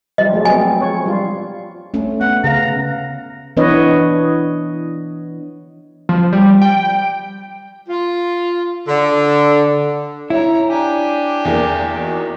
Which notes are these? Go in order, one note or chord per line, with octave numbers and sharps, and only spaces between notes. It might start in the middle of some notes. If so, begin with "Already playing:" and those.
F3 G3 D#5
F#3 G#3 A3
B3 C4 G#5
F3 G#3 C#5
G3 F4
A3 C#4
B3 F#5
C#3 F5 A#5
E3 B3 D4 B4 C#5 D#5
F3
G3
G5
F4
D3
E4 C#5 A#5
D4 G4 G#5
E2 A#3
D#4 F#4